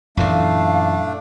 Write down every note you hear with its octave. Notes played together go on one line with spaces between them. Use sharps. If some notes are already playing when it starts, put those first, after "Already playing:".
F#2 A#2 E3 A3 D4 F5